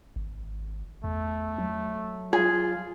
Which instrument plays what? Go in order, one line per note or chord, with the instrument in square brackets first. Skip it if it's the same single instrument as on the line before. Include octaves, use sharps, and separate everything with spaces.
[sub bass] G#1
[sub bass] E2 [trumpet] A3
[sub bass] F#3
[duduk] F4 [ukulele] G#4